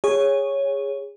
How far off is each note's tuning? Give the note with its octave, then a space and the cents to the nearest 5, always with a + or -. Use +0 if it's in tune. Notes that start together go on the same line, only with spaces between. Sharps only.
G#4 -20 C#5 +0